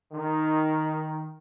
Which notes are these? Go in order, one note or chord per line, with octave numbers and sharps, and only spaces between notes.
D#3